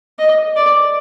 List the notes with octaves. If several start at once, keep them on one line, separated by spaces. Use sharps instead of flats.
D#5
D5